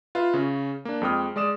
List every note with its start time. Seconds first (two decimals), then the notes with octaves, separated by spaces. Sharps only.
0.15 F4 B4 E5 F5
0.34 C#3 C#4
0.85 A#3 D4
1.02 F2 G#3 G5 D#6 F6
1.36 G#3 D5 D#6 E7